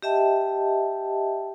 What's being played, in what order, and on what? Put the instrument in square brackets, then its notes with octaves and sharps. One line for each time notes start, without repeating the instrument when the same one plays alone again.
[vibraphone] G4 D#5 E5 G5 A5